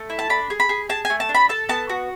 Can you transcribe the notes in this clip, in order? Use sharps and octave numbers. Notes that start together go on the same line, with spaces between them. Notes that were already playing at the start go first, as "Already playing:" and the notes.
Already playing: A3
E4
A5
D4 B5
G#4
B5
G#4
G#4 A5
G#5
A3
A5
D4
B5
A4 A5
B3 A5
F#4